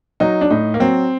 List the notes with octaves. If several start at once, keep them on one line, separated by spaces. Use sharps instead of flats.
F#3 D#4
D4
A2 D#4
A#3
F#3 C4